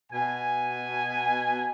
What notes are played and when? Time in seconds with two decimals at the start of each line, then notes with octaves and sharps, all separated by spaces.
0.12 B2 G#5